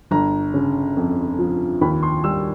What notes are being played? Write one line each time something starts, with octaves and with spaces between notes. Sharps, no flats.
G1 A#5
C#3
F2
F3
D#2 B5
C6
G3 E6